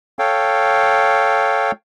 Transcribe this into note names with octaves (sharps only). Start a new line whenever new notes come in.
A4 C#5 F5 G5